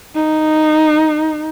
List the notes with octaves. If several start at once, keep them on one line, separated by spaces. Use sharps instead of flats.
D#4